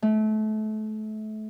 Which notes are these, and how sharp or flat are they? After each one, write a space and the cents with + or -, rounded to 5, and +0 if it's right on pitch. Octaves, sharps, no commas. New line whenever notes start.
A3 -30